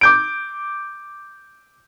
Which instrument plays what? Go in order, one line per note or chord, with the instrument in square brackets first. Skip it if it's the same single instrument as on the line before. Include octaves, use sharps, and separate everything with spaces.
[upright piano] D6 G6 D7